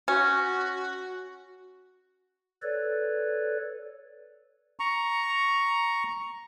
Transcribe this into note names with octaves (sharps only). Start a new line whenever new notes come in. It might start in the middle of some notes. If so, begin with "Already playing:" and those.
C#4 F#4
A4 B4 C#5 D5
A#5 C#6